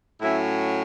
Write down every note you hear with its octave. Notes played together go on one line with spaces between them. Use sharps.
A2 F#3 C#4 E4